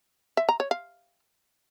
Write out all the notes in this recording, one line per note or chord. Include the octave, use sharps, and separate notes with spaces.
E5
A#5
C#5
F5